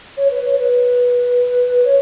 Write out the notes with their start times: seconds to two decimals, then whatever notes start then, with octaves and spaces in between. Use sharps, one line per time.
0.17 C#5
0.31 B4
0.45 C#5
0.59 B4
1.84 C#5